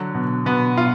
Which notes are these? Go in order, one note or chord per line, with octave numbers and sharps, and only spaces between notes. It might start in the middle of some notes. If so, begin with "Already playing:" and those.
Already playing: D3 F#3
B2
B2 B3
B2 F4